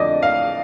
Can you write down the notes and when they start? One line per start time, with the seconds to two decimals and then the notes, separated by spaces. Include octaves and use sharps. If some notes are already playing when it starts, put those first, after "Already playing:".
Already playing: F2 D3 D5 D#5
0.23 F5